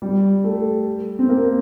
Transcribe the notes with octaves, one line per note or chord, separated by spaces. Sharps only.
G3
A3
C4
A#3